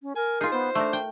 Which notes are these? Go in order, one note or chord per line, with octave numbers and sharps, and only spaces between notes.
C#4
A#4 G#5
D#4 F4 G#4
B3 C5
A3 D4 A#4
G5